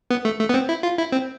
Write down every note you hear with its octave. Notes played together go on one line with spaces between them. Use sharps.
B3
A3
A3
B3
C4
E4
F4
E4
C4